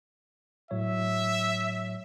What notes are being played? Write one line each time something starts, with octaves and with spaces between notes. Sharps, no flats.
A2 F#3 C#5 E5